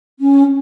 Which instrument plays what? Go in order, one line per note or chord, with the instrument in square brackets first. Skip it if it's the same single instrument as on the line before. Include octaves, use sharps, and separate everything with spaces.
[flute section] C#4